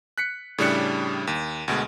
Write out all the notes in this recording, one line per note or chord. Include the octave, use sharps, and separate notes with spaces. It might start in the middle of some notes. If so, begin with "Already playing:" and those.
F#6 B6 C#7
A2 C#3 G3 D4 F#6 C#7
D#2
D2 B2 G#3